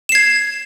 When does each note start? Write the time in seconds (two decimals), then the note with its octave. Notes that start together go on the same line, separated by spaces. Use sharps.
0.09 E7
0.12 C7
0.15 G#6